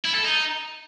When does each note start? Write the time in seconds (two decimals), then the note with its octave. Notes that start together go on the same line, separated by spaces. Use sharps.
0.05 E4
0.15 A4
0.25 D#4